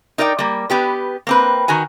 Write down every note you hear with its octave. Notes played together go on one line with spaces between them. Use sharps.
D#4 A#4 D5 D#5 G5
G3 A#3
B3 G4 B4
A#3 C4 B4
D#3 F#4 A#4 G#5